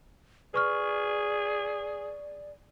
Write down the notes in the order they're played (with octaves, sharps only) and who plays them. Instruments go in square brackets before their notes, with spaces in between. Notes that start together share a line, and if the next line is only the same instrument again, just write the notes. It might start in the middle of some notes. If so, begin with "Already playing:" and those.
[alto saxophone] G#4 [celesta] B4 C#6 F6 [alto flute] D5